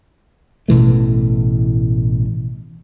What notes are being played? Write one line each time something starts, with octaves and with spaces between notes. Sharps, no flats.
A1 B2 E3 A3